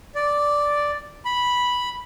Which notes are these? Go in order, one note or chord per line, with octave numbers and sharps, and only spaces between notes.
D5
B5